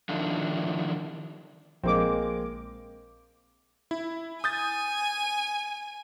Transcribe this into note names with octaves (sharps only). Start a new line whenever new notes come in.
D3 D#3 F3 D4 E4
A#1 G#3 A#3 C4 D6
E4
G#5 D#6 G6 A6